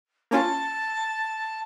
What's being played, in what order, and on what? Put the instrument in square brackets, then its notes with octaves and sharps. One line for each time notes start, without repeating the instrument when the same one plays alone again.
[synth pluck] A#3 C#4 F4 [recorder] A5